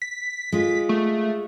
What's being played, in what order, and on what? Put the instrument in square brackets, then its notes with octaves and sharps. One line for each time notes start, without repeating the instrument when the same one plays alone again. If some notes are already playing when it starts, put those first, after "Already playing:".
[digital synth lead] B6
[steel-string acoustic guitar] G#3 F4
[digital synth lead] A3